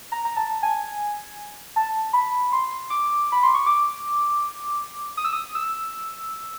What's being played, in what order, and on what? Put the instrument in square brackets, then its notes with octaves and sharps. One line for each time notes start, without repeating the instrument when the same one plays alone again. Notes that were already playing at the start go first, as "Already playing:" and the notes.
[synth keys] A#5
A#5
A5
G#5
A5
B5
C6
D6
B5
C6
C#6
D6
D#6
E6
D#6
E6